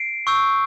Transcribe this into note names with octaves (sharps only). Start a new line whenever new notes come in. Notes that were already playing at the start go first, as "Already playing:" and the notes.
Already playing: C7 D7
C#6 E6 G6